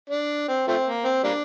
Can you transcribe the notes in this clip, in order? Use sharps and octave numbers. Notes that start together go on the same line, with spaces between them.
D4
C4
F3 A3 C4
A#3
C4
G3 A#3 D4